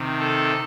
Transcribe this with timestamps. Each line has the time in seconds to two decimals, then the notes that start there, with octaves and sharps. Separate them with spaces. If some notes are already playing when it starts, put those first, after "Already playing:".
Already playing: C3 D#3
0.18 A4